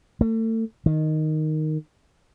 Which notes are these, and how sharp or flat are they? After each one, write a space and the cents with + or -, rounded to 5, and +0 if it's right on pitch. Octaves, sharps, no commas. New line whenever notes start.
A3 +35
D#3 -5